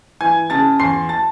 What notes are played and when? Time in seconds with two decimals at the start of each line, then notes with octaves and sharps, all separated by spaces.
0.21 E3 G#5 G#6
0.50 C#3 A5 A6
0.79 E2 C6 C7
1.09 A5 A6